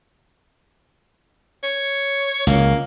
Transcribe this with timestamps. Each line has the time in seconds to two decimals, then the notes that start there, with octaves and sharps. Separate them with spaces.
1.63 C#5
2.47 C#2 A#3